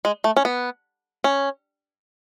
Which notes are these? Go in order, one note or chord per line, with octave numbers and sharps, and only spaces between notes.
G#3
A3
C#4
B3
C#4